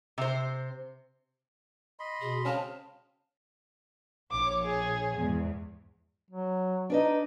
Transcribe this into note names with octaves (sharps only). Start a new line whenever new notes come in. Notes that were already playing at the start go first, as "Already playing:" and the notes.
C3 C5
D#5 B5 C6
B2 G#4
C#3 C4 F5 A5
A#1 C#5 D6
G#4
E2 G#2
F#3
D4 D#4 B4 D#5